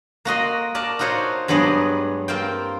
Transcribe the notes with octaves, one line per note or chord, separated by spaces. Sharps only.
A#3 F#4 D#5 C6
A#4 D5 A5
D#4 F4 F#4 C5 C#5
G2 F#3 G#3 B3 G#4 D5
A#3 C4 F4 C5 G5